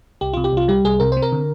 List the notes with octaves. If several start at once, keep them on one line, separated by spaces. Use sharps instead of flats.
C2 G4
C3 F4
G4
C2 F4
G3 G4
C2 G#4
C3 A#4
C4 C5
A#4
D3